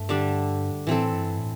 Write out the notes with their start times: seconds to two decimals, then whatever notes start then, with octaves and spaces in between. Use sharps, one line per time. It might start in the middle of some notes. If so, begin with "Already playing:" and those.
Already playing: G2 A3
0.09 D3 G3 D4
0.87 A2 E3 C4 A4
1.12 G2
1.38 A2